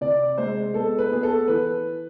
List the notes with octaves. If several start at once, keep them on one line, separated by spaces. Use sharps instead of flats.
C3 D5
G#3 C5
B3 A4
B4
B3 G#4
A4
E3 B4